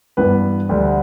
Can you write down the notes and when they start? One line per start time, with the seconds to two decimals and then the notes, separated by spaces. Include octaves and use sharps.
0.17 G2 E3 B3 B4
0.69 D2 D3 G3